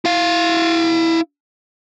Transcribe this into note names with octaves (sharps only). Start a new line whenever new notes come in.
E4 F5